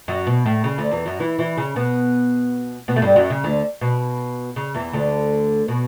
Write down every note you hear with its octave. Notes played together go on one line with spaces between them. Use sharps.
F#2 F#3
B2
A2
C#3
D2 D3
E2 E3
F#2 F#3
E3 E4
E3 E4
C#3 C#4
B2 B3
B2 B3
A3
G2 G3
F#2 F#3
C#3
D2 D3
B2
C#3
E2 E3
D2 D3
B2